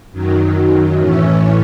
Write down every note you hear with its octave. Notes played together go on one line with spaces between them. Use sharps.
F#2 D#3 F#3
A2 E3 A3 C#4